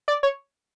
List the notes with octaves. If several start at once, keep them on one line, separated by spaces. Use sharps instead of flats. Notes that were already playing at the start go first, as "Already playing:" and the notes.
D5
C#5